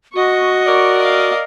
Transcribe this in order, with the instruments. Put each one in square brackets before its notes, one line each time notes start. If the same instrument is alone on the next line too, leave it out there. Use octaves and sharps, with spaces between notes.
[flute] F#4 [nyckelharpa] D#5 C#6
[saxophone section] A#4 D5
[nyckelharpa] D#5 F5